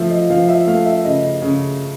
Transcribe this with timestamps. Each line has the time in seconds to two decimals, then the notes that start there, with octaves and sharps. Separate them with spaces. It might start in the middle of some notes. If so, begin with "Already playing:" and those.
Already playing: F3 A3 E5 F5
0.11 D#5
0.30 F3 F5
0.48 E5
0.67 A3 F5
0.86 E5
1.05 C#3 D#5
1.42 C#3